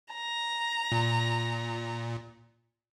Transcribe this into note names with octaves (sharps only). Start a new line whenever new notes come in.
A#5
A#2